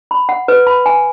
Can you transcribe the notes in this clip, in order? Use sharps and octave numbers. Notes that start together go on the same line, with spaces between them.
B5
F#5
B4
B5
G#5